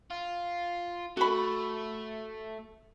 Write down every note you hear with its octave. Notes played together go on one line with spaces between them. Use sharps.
F4
A3 F#4 B5